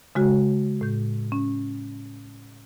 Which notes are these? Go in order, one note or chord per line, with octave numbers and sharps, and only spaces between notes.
C#3 G#3 F#4
A2 G6
C#4